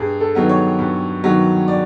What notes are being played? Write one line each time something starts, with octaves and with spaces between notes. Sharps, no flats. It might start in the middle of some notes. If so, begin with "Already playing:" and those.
Already playing: G2 G#4
A4
D#3 F#3 B3
C#5
G2
D#3 F#3 B3
D5